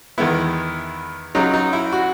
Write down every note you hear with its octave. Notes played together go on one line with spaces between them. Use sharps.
E2 D#3 G#3 B3 E4
C#2 C#3 F#3 D#4
D#4
E4
F#4